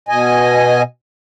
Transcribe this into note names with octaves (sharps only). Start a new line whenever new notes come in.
B2 D#5 G#5